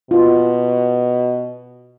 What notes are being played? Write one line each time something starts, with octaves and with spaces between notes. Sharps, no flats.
B2 F4